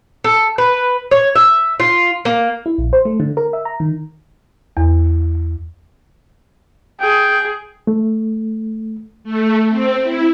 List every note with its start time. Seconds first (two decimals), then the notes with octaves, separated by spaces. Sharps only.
0.24 A4
0.58 B4
1.11 C#5
1.36 E5
1.80 F4
2.25 A#3
2.66 E4
2.78 A#1
2.93 C5
3.05 A3
3.20 D3
3.37 A#4
3.53 E5
3.65 A#5
3.80 D#3
4.77 E2
7.01 G#4 G5
7.87 A3
9.24 A3
9.69 C4
10.02 E4